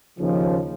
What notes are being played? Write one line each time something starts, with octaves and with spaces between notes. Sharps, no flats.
D#2 C#3 F3